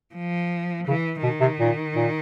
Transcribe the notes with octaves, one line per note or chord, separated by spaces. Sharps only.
F3
C#3 E3
B2 D#3
C3
A#2
A#2